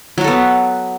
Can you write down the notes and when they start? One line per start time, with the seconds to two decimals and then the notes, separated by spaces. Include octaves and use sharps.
0.18 F#3
0.21 F#4
0.24 A4
0.28 B3